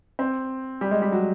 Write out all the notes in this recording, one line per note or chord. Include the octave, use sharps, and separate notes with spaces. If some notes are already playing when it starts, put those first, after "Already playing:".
C4
G3
G#3
G3
F#3